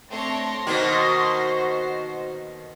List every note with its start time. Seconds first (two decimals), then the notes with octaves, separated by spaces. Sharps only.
0.11 A3 C4 D4 C#5 C6 A#6
0.67 B2 D#3 A#3 F#4 C5